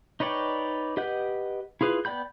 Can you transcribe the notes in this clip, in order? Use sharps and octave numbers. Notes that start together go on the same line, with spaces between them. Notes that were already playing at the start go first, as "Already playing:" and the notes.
D#4 B4 C#5 D5 G5
G4 B4 D#5 F#5 G6
E4 F4 G#4 B4
B3 D5 G5 B5 G6